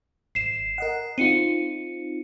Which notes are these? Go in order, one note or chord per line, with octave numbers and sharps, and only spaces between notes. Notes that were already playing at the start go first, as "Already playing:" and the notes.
G#1 C7 E7
A#4 D#5 F#5
C4 D#4 F4 C#7 D#7